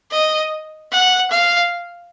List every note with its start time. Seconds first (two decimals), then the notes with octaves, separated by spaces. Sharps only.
0.11 D#5
0.92 F#5
1.31 F5